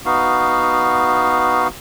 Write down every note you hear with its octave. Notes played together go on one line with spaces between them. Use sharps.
B3 D#4 F#4 F5